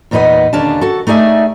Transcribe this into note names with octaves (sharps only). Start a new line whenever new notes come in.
E2 A#2 D#4 B4 D#5 F#5
D#2 D3 C#4 D4 F5 A5
F#4 A4
A3 D#4 G#4 D5 E5